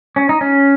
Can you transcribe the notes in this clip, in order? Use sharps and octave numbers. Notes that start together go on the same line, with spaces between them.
C#4
D#4
C#4